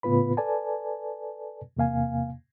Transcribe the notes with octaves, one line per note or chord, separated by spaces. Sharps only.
A2 C#3 B3 F4 B4 B5
A4 B4 D5 G#5 A5
E2 C3 A#3 F5 G#5